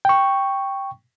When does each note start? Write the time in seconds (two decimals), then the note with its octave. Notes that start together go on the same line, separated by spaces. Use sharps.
0.05 G5 C#6